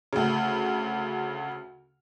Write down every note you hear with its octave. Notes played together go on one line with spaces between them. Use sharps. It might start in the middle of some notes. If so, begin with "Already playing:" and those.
D2 C#3